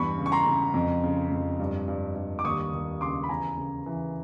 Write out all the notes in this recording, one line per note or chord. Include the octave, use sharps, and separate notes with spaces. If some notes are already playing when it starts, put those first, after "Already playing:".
Already playing: E2 G2 B5 C#6
C#3
C#6
A#5 C6
C#3
F2
C#3
F2
G2
G2
G2
D6
D#2 C#6 D#6
D#2
C#3 C6 D6
B5
E2 G#5 A#5
C#3
E3